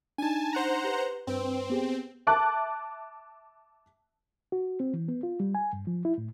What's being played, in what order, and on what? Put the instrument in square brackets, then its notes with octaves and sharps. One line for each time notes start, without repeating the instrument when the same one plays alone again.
[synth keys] D4 D#4 [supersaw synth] G#5 A5
[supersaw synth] C5 F#5 A#5
[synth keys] G4 B4
[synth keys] G2 B4 D7 [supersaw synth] C4
[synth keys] B3 G4 G#4
[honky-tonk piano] E5 A5 D6 F#6
[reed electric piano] F#4
C4
E3
B3
F4
G3
G#5
G2
F3
E4
A2